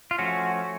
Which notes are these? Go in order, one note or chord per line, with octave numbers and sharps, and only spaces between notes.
F4
F3 A3 C#4 F#4